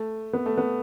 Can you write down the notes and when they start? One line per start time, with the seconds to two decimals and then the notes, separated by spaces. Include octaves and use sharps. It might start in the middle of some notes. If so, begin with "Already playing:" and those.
Already playing: A3
0.33 B3
0.46 A3
0.58 B3